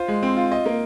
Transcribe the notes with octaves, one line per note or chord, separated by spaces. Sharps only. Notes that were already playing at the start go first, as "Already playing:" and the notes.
Already playing: F4 C5
G#3
C4
F4
D#5
A#3